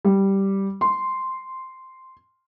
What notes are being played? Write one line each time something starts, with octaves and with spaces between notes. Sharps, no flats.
G3
C6